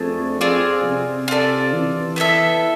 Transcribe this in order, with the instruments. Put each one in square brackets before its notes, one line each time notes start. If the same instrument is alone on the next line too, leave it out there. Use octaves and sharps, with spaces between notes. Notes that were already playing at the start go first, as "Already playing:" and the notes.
Already playing: [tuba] F2 [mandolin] A3 D4 G#4
[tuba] F2 [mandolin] C4 F4 G#4 D5
[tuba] C3
[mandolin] F4 A4 D5
[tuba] E3
[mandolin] B3 E4 A4 E5